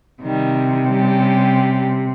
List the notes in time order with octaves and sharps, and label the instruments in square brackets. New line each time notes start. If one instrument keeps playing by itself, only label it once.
[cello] C3 [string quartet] D#3 G3
[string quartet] G3 C#4 G4